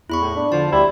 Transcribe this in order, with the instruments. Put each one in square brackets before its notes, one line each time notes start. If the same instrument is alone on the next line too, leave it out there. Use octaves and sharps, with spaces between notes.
[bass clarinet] E2 [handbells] E4 B5 C#6
[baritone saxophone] A2
[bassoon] D4
[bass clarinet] D3 [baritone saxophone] F3 [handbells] A5
[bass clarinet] D2 [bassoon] G3 [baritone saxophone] E4